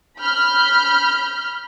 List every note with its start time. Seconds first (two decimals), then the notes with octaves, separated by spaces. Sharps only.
0.19 B5 F6 G6